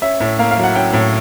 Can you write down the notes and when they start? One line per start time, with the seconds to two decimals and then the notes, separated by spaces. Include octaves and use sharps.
0.02 C#4 E5
0.21 A2
0.39 A#3 F5
0.51 F5
0.57 F#3
0.63 F#5
0.75 C#4 G5
0.93 A2